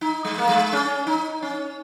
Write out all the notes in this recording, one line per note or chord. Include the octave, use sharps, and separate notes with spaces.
D#4
G#3
A#3
G#3
C#4
D#4
C#4